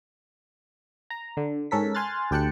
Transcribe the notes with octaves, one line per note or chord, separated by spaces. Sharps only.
A#5
D3
G#2 C#4 A4 A#4 B6
G#5 C6 F6 F#6 A6
D2 G4 G5 A5 F#6 C#7